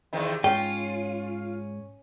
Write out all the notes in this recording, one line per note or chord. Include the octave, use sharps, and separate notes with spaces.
E2 C3 D#3
G#2 C#4 F4 G5